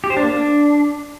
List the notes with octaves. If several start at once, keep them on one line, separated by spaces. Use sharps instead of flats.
G4
C5
D4
A#3
D4